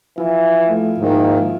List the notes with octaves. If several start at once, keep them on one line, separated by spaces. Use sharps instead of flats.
E3 F3 E4 F4
A3
G#2 D#3 A#3